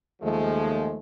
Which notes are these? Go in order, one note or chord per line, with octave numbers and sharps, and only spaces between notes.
D#2 F3 G#3 A3